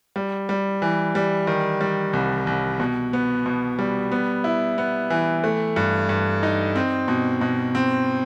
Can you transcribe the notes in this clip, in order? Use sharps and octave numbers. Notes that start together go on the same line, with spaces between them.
G3
G3
E3
G3
D#3
G3
C2
C2
B2
B3
B2
G3
B3
E4
B3
E3
A3
G2
G2
D#4
C4
B2
B2
C4